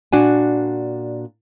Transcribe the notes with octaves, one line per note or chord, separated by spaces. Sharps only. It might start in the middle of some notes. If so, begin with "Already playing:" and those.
A#2 D4 F#4 G#5